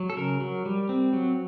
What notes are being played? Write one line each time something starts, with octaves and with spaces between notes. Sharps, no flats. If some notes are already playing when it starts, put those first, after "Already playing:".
Already playing: F#3
A4
C#3 A#4
F#3
G3
C4
F#3